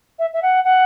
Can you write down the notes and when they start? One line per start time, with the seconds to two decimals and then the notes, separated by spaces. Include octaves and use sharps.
0.19 E5
0.33 E5
0.42 F#5
0.64 F#5